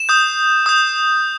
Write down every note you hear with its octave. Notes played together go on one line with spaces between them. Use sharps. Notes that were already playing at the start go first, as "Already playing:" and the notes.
Already playing: E7
D#6 G6
D#6 G6